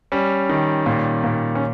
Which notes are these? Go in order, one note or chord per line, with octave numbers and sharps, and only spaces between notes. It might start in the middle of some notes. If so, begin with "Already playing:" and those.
G3 C#4
D#3
A#2
A#2
C#4